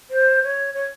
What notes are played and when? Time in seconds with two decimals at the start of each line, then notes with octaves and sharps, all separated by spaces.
0.10 C5
0.42 C#5
0.74 C#5